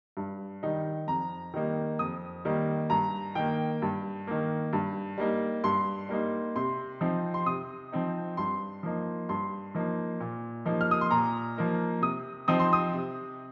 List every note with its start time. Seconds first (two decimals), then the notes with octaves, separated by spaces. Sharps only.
0.17 G2
0.63 D#3 G3 D#4
1.07 F2 A#5
1.54 D#3 G3 A#3 D#4
1.99 F2 D#6
2.45 D#3 G3 A#3 D#4
2.90 G2 A#5
3.35 D#3 A#3 G5
3.82 G2
4.27 D#3 A#3
4.73 G2
5.18 G3 A#3 D#4
5.64 G2 C6
6.09 G3 A#3 D#4
6.56 C3 C6
7.01 F3 C4 D#4
7.34 C6
7.46 C3 D#6
7.92 F3 C4 D#4
8.37 G2 C6
8.83 F3 A#3 D#4
9.29 G2 C6
9.75 F3 A#3 D#4
10.20 A#2
10.65 F3 A#3 D#4
10.81 F6
10.91 D#6
11.01 C6
11.11 A#2 A#5
11.57 F3 A#3 D#4
12.02 C3 D#6
12.48 F3 C4 D#4 D#6
12.60 C6
12.73 D#6
12.94 C3